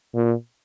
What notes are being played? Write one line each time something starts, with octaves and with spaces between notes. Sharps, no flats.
A#2